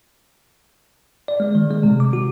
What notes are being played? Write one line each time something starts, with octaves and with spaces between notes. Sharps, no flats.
D5
G#3
D#3
G#3
C3
D6
F#4